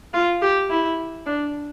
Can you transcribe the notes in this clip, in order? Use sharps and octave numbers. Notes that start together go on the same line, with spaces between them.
F4
G4
E4
D4